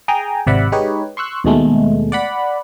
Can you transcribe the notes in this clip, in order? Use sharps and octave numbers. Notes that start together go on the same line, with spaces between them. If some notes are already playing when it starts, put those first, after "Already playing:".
G#4 G5 G#5 A#5
G#1 C3 D5 E5 F#5 B5
G#3 D#4 G4 B4 C#5
C6 C#6 E6 F#6
D#2 B2 G#3 A3
D5 F#5 B5